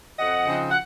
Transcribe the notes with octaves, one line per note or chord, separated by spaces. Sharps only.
F2 D#5 F#5
C#3 F3 C4 D#4
F#5